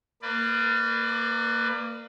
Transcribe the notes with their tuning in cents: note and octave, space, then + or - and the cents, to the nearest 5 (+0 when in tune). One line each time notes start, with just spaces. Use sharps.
A#3 -15 B4 +15 D5 +25